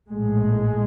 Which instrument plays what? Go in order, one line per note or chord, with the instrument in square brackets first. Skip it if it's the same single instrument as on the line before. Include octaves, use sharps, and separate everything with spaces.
[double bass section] A#1 A2 G#3